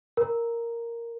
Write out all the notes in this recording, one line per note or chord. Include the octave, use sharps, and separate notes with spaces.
A#4